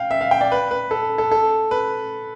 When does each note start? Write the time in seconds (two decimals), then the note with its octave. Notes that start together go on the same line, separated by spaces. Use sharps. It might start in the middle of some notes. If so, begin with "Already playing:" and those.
Already playing: F5 G5
0.11 E5
0.21 F5
0.31 G5
0.41 D5
0.52 B4
0.71 B4
0.91 A4
1.18 A4
1.32 A4
1.71 B4